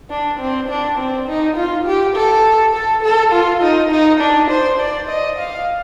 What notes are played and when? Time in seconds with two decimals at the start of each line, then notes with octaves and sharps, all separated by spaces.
0.10 D4
0.39 C4
0.69 D4
0.98 C4
1.28 D#4
1.56 F4
1.86 G4
2.16 A4
2.74 A4
3.03 A4
3.32 F4
3.62 D#4
3.91 D#4
4.21 D4
4.50 C5
4.79 D5
5.09 D#5
5.38 F5